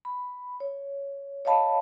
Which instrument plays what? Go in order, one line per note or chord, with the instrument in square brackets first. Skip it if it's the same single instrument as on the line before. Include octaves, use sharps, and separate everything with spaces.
[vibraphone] B5
C#5
C#5 D#5 F5 A5 B5